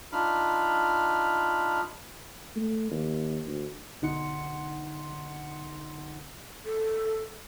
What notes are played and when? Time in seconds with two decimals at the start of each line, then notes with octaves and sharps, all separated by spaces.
0.13 D4 D#4 F4 B5 F6
2.56 A3
2.91 D#2
3.46 D2
4.02 B1 D3 D#4 F#5 C6 C#7
6.66 A4